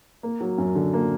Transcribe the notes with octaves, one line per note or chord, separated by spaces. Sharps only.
A#3
F#3
F#2
D3
A#3